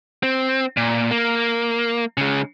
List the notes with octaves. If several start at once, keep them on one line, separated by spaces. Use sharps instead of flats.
C4
A#2
A#3
C#3 G#3